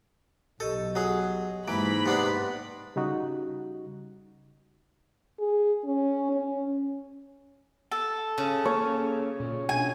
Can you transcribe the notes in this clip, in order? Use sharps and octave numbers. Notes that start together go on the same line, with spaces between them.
B1 G4 A4 D#5 C#6
F#3 G#4
G#2 E3 A#3 B5
C3 B3 D4 B4
C#3 G3 D#4 F#4
G#4
C#4
C#4
A4
C#3
A#3 C#5
A#2
B2 C#4 D4 G#5